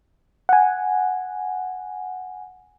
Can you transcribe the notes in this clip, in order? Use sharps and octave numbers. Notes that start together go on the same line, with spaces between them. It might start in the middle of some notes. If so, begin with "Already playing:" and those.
F#5 G#5